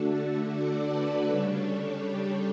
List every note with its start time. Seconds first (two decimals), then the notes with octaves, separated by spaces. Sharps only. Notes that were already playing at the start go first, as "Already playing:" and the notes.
Already playing: D3 A3 D4 F#4 A4
0.14 F#4 A4
0.51 D5 F#5
0.90 B4 D5
1.26 C#3 G3 D4 A4 C#5
2.02 G4